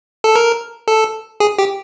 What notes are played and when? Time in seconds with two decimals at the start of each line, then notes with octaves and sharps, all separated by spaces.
0.24 A4
0.36 A#4
0.88 A4
1.40 G#4
1.58 G4